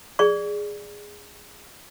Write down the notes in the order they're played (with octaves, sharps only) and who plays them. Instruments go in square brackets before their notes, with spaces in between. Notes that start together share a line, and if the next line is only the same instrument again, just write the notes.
[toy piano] G#4 D5 C#6